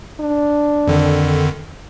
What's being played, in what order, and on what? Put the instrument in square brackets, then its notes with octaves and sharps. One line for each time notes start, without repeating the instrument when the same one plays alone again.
[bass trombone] D4
[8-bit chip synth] F2 D3 D#3